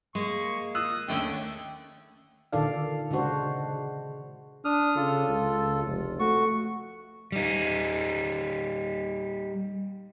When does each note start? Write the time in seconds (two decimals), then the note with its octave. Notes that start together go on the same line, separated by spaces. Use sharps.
0.15 G#3 A#3 C#6
0.75 D#6 E6 F#6
1.08 D#2 D3 A3 C#4 G5
2.53 A#2 D3 D#3 A4 D5 F5
3.11 C#3 G#3 D4 F#4 C5
4.65 D4 D#6 F6
4.96 C#3 F4 A4
5.28 C#2
5.86 F1
6.20 A3 F#4 C#6
7.32 G3 D#4